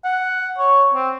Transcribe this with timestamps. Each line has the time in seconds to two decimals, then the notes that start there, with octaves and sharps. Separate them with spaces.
0.04 F#5
0.58 C#5
0.94 C4